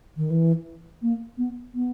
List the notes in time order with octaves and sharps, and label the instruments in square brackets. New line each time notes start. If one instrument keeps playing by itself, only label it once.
[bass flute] D#3
E3
A#3
B3
B3